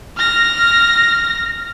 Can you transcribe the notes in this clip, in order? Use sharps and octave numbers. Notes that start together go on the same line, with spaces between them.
F6 A#6